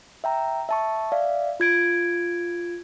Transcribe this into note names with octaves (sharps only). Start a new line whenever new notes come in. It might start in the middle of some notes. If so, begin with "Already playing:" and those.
E5 G5 A#5
E5 A5 C#6
D5 E5 F5
F4 G#6 D7